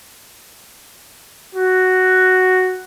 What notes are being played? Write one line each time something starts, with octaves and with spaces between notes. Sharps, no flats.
F#4